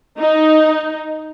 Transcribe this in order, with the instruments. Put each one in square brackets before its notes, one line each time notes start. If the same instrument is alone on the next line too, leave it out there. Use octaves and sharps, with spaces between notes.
[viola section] D#4